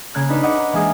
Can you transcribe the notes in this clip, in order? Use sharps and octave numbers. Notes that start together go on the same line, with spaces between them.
C#3 A#3 F#6 G#6
D4 D#4 B4
D#5 F#5 D6
A#5
E3 G#3 A#3 G#4 D#6